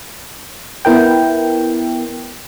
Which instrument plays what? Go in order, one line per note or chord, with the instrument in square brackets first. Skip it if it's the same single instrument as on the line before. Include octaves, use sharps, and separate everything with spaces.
[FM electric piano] B3 E4 A#4 G5